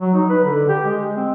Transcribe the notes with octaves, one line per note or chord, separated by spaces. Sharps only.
F#3
D#4
B4
D3
G4
G#3
C4